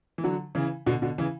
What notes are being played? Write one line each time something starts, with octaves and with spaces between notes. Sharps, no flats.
E3
D3 F#3
C#3 E3
B2 D3
B2 D3
C#3 E3